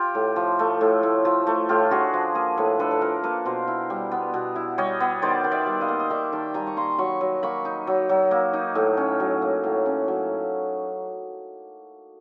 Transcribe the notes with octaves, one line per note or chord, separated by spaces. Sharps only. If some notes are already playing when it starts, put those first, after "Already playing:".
Already playing: F4 G4
A2
F3
A3
A2
A2
F3
A3
A2 F4 G4
D4 F#4 G#4
F3
A#3 G#4 A#4
A2 A4 B4
D4 A4 B4
A4
F3 G#4 A#4
A#3 A4 B4
B2 A#4 C5
E4
G3
B3
B2
E4
G3 C#5 D#5
B3
D#3 C5 D5
D#3
D5 E5
G3
D#5 F5
A#3
D#5
D#3 D5 E5
D#3 G5 A5
G3 G#5 A#5
C#6
A#3 A#5 C6
F#3 B5 C#6
F#3
A#3 B5 C#6
D#4
F#3
F#3
A#3
D#4
A2
C#4
F#3
A#3
A2
C#4
F#3